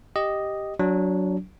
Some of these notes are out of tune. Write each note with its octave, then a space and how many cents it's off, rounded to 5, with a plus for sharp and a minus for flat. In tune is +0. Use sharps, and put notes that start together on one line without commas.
G4 +0 D#5 +0
F#3 +0 D4 -20